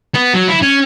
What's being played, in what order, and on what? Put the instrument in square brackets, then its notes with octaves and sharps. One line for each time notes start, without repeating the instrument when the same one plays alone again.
[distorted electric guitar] B3
F#3
E4
C#4